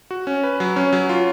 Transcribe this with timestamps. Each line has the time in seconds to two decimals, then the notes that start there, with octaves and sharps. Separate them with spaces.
0.11 F#4
0.27 C#4
0.43 B4
0.60 F#3
0.76 C#4
0.93 F#3
1.09 F4